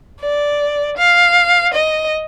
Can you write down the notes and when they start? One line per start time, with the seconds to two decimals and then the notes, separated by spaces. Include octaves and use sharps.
0.20 D5
0.97 F5
1.74 D#5